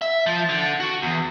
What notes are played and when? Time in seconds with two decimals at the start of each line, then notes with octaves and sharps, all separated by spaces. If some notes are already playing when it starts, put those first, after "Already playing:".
0.02 E5
0.26 F3
0.49 D3
0.80 F#4
1.02 E2